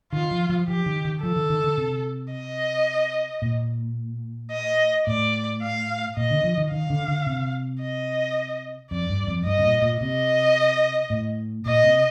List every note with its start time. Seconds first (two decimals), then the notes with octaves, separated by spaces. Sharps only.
0.13 D#3 F4
0.31 F3
0.49 F3
0.68 F3 G4
0.86 D#3
1.05 D#3
1.23 F3 A4
1.36 D#3
1.50 D#3
1.64 D3
1.77 C3
2.32 D#5
3.42 A#2
4.52 D#5
5.07 A2 D5
5.62 F5
6.16 A#2 D#5
6.31 D3
6.44 F3
6.58 D#3
6.72 D#3 F5
6.90 D3
7.08 D3
7.26 C3
7.82 D#5
8.91 F2 D5
9.09 G2
9.27 F2
9.45 G2 D#5
9.58 C3
9.64 A#2
9.82 A#2
10.01 C3 D#5
11.10 A2
11.66 A#2 D#5
11.84 C3